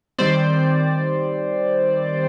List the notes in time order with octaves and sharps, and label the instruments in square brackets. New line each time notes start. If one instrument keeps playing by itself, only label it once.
[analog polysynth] D#3 G3 C4 C5 D5